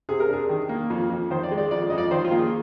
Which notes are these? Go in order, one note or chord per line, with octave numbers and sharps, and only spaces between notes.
C3 G#4
A#4
D4 G#4
D#3
A#3
F2
F2
D#3 C5
D5
G#3
D5
F2 D5
F2 D#5
D5
D#3 C5
F4
A#3
G#4